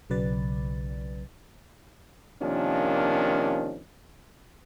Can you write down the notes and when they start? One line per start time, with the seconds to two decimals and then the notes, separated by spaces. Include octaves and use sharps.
0.10 B1 C#3 F#3 B4 D5 A6
2.41 C3 D#3 F3 A#3 C#4 D4